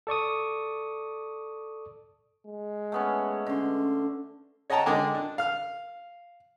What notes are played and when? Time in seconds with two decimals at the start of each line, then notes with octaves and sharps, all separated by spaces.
0.07 A4 D5 C#6 D#6
2.45 G#3
2.92 A3 B3 C#4
3.47 D3 C#4 C6
4.70 C#5 D#5 F#5 G5 A5 A#5
4.86 D3 G#3 D#5 G5 G#5 D6
5.15 D4
5.38 F5 F6